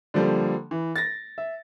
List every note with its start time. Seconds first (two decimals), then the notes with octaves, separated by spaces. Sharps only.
0.14 D3 F3 G3 A#3
0.71 E3
0.96 A6 A#6
1.38 E5